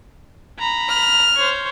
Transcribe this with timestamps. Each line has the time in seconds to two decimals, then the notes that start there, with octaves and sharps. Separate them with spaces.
0.59 A#5 B5
0.89 F6
1.36 C5 C#5